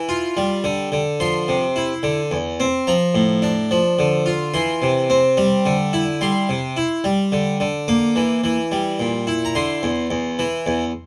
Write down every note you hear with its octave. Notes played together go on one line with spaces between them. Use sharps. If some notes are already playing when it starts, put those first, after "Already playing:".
Already playing: E3
F4
G3
D3
D3
F3 C6
C3
E4
D3
E2
C4
F3 A#5
A2
D4
F3
D3
F4
E3 C6
C3
C4
G3
D3
E4
G3 C6
C3
E4
G3
D3
D3
A#3 D6
E3
E3
G3
A#2
E4
A#5
D3 C6
E2
E2
E3
E2